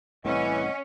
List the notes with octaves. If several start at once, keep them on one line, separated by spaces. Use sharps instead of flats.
C2 A2 C3 E3 C#4 D#5 F#5